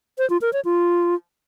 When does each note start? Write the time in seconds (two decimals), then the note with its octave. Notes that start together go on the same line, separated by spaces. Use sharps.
0.18 C5
0.30 F4
0.41 A#4
0.53 C#5
0.65 F4